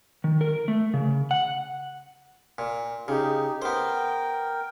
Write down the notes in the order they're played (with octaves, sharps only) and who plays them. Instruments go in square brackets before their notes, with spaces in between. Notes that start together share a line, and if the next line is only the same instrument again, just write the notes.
[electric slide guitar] D#3
A#4
A3
C#3
F#5
[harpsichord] A#2
[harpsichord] C#3 [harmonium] D#4 G4
[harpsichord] B3 C5 [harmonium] A#4 G5